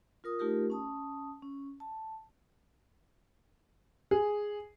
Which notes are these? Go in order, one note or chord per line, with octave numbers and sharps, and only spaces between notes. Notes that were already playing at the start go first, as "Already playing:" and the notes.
F4 A#4 D#6
A3 D#4 F4 G4 A#4
C#4 A5 D#6
C#4
A5
G#4